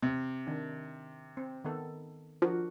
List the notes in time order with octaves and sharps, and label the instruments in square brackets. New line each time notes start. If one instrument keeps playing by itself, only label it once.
[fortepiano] C3
[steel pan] D#3 D4
C4
D#3 B3 A4
[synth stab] F3 [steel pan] D4 F#4 A#4